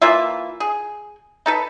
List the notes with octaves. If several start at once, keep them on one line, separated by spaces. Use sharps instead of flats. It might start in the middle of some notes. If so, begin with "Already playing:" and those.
E3 A#3 F4 E5
G#4
D#4 A4 B4